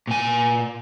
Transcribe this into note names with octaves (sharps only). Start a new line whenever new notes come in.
A#2 G#5